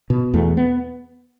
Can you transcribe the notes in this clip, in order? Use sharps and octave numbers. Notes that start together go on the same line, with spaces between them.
B2
E2 A3
B3